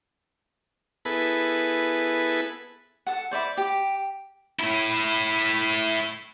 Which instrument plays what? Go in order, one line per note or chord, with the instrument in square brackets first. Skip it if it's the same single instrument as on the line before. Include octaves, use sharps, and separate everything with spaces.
[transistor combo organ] B3 E4 G#4 A4 B4
[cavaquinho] A4 F#5
C5 D5 E5 B5
G4
[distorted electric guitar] A3 E4